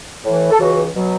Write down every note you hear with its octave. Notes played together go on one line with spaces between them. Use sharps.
A2 E3
A4
C#2 C#3 E3 F#4
B2 F#3